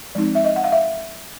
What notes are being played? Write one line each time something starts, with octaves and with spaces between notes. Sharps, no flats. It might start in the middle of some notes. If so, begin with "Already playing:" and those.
F3 G#3 C4 D#4 D5
E5
D#5
F#5
F5
E5